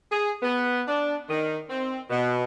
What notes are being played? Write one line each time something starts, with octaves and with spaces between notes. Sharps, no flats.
G#4
B3
D4
D#3
C4
B2